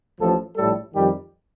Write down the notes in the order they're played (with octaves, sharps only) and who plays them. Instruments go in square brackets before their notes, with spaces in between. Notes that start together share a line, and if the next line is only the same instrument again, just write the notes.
[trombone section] A1 A2 F3 A4
A#1 A2 G3 A4
F2 D#3 G3 G4